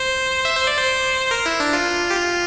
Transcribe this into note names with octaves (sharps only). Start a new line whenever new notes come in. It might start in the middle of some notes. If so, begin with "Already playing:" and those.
Already playing: C5
E5
C5
D5
C5
A#4
E4
D4
F4
G4
F4